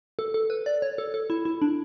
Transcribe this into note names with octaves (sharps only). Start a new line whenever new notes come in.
A4
A4
B4
D5
C#5
A4
A4
E4
E4
D4